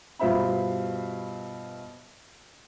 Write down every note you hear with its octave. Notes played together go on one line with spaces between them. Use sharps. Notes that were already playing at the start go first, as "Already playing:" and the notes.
G2 B2 F4 C5 E5 B5